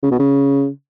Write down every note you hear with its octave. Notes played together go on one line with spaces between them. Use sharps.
C#3
B2
C#3